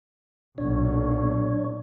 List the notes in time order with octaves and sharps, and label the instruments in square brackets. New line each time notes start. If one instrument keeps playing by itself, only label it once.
[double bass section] B1 A#2 [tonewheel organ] D4 C#5